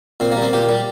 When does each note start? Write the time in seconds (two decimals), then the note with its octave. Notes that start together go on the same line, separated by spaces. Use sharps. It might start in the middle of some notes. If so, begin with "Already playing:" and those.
0.20 A#2 C4
0.32 A#3
0.37 G3
0.42 C4
0.53 A#2 G4
0.69 G3